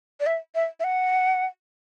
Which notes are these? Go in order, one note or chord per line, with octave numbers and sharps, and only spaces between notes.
D5
E5
E5
E5
F#5